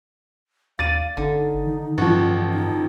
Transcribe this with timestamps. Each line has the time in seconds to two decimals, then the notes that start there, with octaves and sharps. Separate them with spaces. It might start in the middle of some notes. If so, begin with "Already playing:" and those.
0.79 D#2 D5 F5 A6 D#7
1.17 G1 D3 D#4
1.67 D#3
1.98 A1 G2 F3 F#4
2.53 D#4